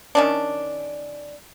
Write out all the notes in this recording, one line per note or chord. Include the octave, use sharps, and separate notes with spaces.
D#3 C#4 D4